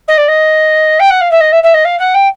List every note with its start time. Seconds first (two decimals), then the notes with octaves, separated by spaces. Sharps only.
0.08 D#5
0.17 D5
0.28 D#5
0.99 G5
1.10 F#5
1.20 F5
1.31 E5
1.40 D#5
1.52 E5
1.63 E5
1.74 D#5
1.84 F5
1.99 F#5
2.14 G5